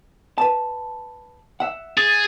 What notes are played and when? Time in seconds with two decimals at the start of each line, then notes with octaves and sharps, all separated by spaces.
0.38 B4 A5
1.60 E5 F#5
1.97 G#4 A6